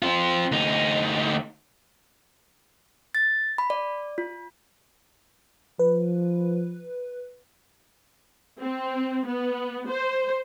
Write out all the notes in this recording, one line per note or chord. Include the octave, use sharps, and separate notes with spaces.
C4 F4
D2 D#4
A6
B5
D5
F4
F3 B4
C4
B3
C5